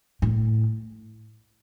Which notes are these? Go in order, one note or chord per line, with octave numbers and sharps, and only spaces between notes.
A2